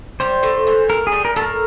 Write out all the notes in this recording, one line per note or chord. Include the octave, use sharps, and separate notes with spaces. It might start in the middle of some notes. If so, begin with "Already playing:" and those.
G3 C5
A2
E3
A2 A#4
G#4
G3
A#4
A2 A4
A#4